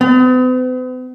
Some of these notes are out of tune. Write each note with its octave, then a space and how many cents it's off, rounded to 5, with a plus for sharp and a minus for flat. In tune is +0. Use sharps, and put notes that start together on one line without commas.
B3 +45